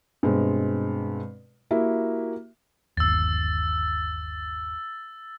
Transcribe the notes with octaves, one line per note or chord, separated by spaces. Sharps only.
G2 B2 G#3 C4
A#3 E4 F#4 G4 E5
G1 D#2 E6 A6